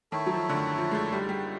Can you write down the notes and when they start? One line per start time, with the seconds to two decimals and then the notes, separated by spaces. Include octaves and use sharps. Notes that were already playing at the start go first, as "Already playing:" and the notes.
0.12 D#3 E4 A4 C#5 E5
0.26 F#3
0.34 F3
0.49 D3
0.57 D#3
0.78 F3
0.91 G#3
0.95 A3
1.12 G3
1.29 G3